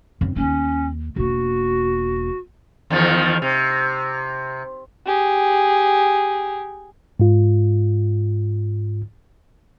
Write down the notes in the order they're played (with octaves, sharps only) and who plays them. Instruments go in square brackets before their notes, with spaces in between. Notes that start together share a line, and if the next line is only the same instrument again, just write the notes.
[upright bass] F#2 C4
[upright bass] E1 D#2 [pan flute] C#4
[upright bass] E1 A#3 [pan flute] F#4
[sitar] E2 D#3 F3
C3
[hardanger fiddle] G4 G#4
[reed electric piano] G#2 F4